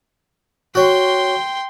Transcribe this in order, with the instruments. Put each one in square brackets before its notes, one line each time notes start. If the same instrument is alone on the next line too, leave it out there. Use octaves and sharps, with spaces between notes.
[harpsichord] F#4 C#5 [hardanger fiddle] G5 C6